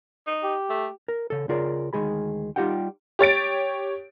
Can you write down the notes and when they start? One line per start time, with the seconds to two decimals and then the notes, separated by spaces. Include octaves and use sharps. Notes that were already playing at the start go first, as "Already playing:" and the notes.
0.27 D#4
0.44 G4
0.70 A3
1.08 A#4
1.30 C#3 A4
1.49 C#3 F4 G#4 A#4 D5
1.93 D2 D#3 G#3 G#4 B5
2.56 G3 D#4 F4 G4 F#5 G5
3.19 G4 C#5 A6 D7